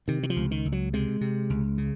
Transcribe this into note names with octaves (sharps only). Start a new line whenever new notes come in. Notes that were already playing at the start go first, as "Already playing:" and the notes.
C3 D#3
D#3
F3
C#2
D#3
C#2
F#3
C3 G#3
C3
C#2
C#3